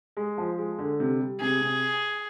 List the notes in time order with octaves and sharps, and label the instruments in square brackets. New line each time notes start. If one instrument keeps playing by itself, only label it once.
[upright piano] G#3
F3
G#3
D3
C3
G3
[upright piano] C3 [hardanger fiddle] G#4
[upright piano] C3